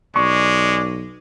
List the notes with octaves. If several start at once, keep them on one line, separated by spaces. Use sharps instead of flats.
B1 G#3 D5 C#6